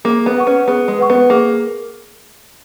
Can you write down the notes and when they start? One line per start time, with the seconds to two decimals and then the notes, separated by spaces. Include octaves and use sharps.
0.05 A#3 G#4
0.26 B3
0.36 B4 F#5 C#6
0.47 C#4
0.67 B3 G#4
0.88 G#3
0.99 B4 F#5 C#6
1.10 B3
1.30 A#3 G#4